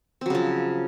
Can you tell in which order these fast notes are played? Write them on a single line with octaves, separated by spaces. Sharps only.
C4 F#3 C#3 F3